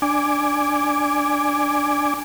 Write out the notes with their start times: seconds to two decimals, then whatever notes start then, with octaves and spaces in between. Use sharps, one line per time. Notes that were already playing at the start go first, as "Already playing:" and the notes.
0.02 D4 G#5 D6